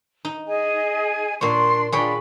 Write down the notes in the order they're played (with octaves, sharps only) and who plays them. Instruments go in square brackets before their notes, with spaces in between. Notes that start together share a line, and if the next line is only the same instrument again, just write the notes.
[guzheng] D#4
[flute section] G#4 D#5 G#5
[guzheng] A#2 C#5 [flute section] D4 C6
[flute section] D4 F4 B5 [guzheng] G#4 C#5 G5